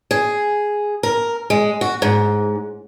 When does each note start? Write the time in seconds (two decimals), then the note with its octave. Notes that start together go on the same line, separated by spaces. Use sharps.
0.11 G#4
1.03 A#4
1.50 G#3
1.81 F#4
2.02 G#2